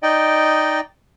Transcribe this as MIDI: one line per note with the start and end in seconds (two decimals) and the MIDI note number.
0.03 0.80 63
0.03 0.80 74
0.03 0.80 75
0.03 0.80 79